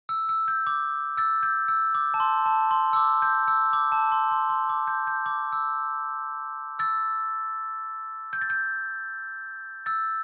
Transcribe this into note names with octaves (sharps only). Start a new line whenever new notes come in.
E6
E6
G6
D6
E6 A6
G6
E6
D6
A5
C6
A5
C6
E6
D6
G6
E6
D6
A5
C6
C6
C6
D6
G6
G6
D6
E6
E6 A6
G6
A6
G6
E6 A6